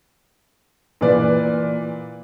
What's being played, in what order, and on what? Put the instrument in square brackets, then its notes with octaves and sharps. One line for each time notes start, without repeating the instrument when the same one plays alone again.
[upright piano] A#2 E3 B4 D5